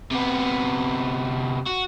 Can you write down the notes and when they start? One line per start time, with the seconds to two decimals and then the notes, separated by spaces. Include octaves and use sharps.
0.11 C3 B3
1.66 F#4